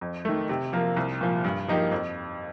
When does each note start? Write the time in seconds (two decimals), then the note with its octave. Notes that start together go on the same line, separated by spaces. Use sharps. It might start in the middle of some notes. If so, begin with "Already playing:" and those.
0.01 F2
0.25 D#3 A3
0.49 C3
0.73 F3 A#3
0.97 C2
1.21 A#2 F3
1.44 G2
1.68 F3 A#3 D#4 G4
1.91 F2